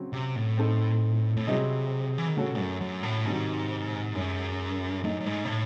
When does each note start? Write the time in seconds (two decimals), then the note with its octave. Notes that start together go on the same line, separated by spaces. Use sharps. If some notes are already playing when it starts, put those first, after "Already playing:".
Already playing: C#3 F#3 C4
0.13 C3
0.36 A2
0.57 C4 D#4 A4
1.37 A2
1.47 C3 F#3 C4 E4 G#4 D#5
2.18 E3
2.27 D#3
2.36 C#3 A3 C#4 F#4 A4
2.59 F#2
2.81 F#2
3.03 A2
3.25 G#2 C3 D#3 F#3
4.15 F#2 G#3 C#4 G#4
5.04 F#2 A3 D#4 A4 D#5
5.21 F#2
5.26 G#2
5.45 C3
5.48 A2